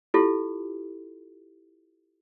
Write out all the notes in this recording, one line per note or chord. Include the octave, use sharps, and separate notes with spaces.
E4 F4 G4 A4